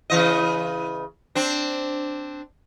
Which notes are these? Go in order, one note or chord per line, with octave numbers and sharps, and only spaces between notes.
C#3 E3 D#5
C4 D4